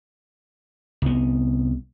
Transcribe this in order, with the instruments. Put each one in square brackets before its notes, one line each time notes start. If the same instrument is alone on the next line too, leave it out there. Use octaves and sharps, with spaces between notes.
[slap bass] C2 B3